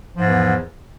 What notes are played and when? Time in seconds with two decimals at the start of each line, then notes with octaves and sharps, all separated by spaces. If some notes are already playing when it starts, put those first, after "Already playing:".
0.17 F3
0.20 G#2
0.23 E2
0.26 E3